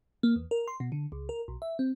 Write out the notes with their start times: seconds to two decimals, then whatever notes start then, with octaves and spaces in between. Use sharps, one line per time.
0.23 A#3
0.36 E2
0.51 A#4
0.68 C6
0.80 B2
0.92 D3
1.12 C#2
1.29 A#4
1.48 B1
1.62 E5
1.79 C4